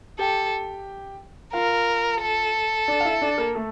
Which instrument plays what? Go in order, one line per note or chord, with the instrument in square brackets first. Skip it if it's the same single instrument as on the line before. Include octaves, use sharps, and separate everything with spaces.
[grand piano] G4 G5 [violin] A4
[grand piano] F4 F5 [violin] A#4
[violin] A4
[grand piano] D4 D5
F5
E4 E5
D4 D5
A#3 A#4
A3 A4